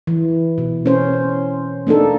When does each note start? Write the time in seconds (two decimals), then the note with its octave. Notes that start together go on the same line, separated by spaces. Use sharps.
0.07 E3
0.58 B2
0.86 C#4 C5
1.87 A#3 D4 D#4 A4